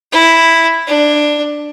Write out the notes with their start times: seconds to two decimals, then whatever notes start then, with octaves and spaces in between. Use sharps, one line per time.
0.12 E4
0.87 D4